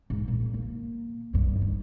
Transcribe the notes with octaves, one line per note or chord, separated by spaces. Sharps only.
G#2
A#2
A#3
G2 D#3
D#4